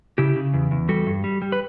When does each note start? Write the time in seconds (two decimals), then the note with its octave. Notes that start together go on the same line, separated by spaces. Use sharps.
0.18 C#3 E4 G4
0.36 C#3
0.53 E2
0.71 E2
0.89 G3 F#4 A4
1.07 G2
1.24 G3
1.42 G3
1.52 B4